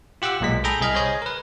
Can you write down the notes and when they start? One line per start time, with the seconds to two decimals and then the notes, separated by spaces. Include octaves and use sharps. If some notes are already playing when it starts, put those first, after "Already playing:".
0.22 F4 G4 F#5 D6 E6
0.40 B1 A#2 G#3 B6
0.64 G#4 A4 G5 A#5 B5
0.81 C2 G#4 D#5 B5 F6
0.95 G#4 C5 C#5 D#5
1.22 A#4 B4